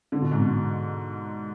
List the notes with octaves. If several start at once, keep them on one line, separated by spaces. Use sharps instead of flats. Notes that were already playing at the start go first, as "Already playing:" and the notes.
D3
B2
G#2
B2